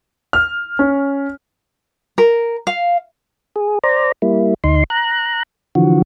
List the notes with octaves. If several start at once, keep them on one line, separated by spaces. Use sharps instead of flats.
F6
C#4
A#4
F5
G#4
C5 D5 A#5
G3 A#3 E4
D2 D#4 C6
A#5 F#6
D3 E3 F3 F#4